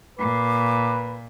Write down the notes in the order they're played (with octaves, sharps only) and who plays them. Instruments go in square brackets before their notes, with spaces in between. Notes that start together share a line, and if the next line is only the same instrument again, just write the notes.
[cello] A#2 [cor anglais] B4 [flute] D6